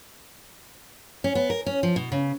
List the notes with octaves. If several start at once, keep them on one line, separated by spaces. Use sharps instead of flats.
C#4
B3
A#4
C#4
F3
B2
C#3